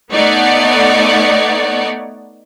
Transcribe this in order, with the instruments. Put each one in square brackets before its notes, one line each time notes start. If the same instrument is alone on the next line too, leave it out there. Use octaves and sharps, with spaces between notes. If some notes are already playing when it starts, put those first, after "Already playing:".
[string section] A3 B3 D#4 C#5 D5 F#5